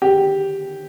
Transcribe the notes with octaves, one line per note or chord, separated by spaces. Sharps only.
G4